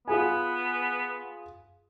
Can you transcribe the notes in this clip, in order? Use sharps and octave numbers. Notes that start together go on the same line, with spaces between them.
B3 F4 G#4 G#5